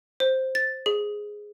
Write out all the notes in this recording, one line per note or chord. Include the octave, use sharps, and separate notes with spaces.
C5
A6
G#4